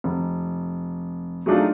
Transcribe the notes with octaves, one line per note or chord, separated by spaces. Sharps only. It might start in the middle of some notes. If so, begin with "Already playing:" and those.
F1
F#3 G#3 A3 D4 D#4 F4